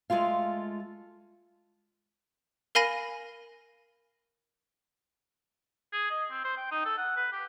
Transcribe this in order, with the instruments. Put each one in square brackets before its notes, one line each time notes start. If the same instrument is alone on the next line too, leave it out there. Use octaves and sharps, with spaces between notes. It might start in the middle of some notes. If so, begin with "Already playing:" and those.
[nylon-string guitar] G#3 A3 F4 F5
[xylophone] A#4 F5 G#5 B5 A#6 D#7
[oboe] G#4
D#5
C4
C5
G5
D#4
A4
F#5
B4
G4